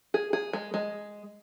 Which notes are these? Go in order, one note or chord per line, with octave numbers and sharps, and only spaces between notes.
G#4
G#4
G#3
G#3